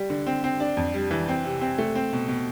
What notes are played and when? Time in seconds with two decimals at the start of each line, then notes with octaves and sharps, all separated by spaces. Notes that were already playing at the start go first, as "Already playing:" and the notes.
Already playing: G3
0.10 D3
0.27 C4
0.44 C4
0.60 D4
0.77 F2
0.94 G3
1.11 E3
1.28 C4
1.45 C3
1.61 C4
1.78 A3
1.95 C4
2.13 B2
2.28 B2